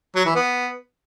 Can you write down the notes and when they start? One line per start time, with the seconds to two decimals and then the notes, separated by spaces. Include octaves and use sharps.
0.16 F#3
0.25 E3
0.35 B3